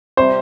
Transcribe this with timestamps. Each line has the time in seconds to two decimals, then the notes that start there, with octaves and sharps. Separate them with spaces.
0.17 C3 G3 C4 C5